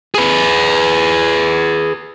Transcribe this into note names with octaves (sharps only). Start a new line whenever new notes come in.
G#4 B4